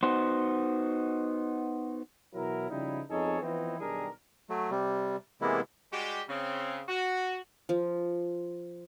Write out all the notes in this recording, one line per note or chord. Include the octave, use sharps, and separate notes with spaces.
B3 D#4 F#4 C5
B2 E3 F#3 E4 A#4
C#3 F3 G3 D#4 E4
F2 B3 D#4 G#4 A4 C#5
E3 F3 B3 C4 D#4 E4
B1 D#3 G3 D4 G#4 A#4
F#3 A3
C3 G3
C3 E3 G#3 A#3 B3 E4
G3 G#3 F#4 G4
C#3 C4
F#4
F3